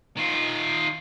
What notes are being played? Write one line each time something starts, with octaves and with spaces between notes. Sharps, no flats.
D#3 F4